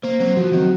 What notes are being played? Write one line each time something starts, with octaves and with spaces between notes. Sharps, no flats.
A#3 C5
F#3 C4
F3 F#4
D#3 F#3